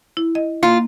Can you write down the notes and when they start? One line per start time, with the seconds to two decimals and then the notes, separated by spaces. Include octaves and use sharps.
0.17 E4
0.35 D#5
0.63 A#3 F4